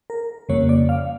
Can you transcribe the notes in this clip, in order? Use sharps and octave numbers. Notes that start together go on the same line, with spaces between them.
A#4
F2 C#3 G3 A#3 C#5
D5
F5